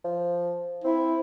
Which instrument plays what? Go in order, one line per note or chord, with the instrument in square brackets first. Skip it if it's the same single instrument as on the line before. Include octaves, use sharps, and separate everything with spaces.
[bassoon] F3
[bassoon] C4 [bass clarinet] E4